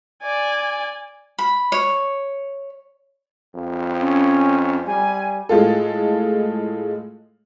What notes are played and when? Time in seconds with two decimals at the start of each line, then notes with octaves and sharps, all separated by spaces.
0.23 D5 G#5
1.39 B5
1.72 C#5
3.55 F2
4.01 C#4
4.86 G3 G#5
5.49 A2 G#3 F4 A4